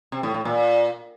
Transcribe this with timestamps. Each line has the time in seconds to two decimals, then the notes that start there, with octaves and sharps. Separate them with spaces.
0.12 C3
0.23 A2
0.34 A2
0.45 A#2